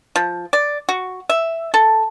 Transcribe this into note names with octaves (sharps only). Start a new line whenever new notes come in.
F3
D5
F#4
E5
A4